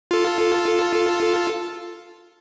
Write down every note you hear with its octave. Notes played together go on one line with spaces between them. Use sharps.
F4 A4